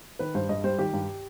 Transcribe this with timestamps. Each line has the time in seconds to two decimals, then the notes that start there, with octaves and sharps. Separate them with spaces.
0.19 D#3 B4
0.34 G2 C5
0.49 G2 D#5
0.64 G3 C5
0.79 D#3 G4
0.93 G2